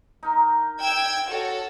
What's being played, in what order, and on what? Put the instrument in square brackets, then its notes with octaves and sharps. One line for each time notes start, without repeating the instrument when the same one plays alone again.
[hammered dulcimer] D#4 A#4
[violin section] G5 E6 G#6
F#4 A4 C#5